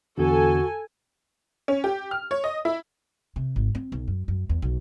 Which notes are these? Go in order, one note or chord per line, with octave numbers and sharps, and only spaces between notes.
E2 D3 F#4 A4 G#5
C#4
G4
F6
C#5
D#5
E4
C3
G#1
C4
B1
F#2
F#2
E2
B1